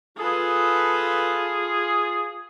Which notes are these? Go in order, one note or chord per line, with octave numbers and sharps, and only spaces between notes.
F4 G#4 A4 B4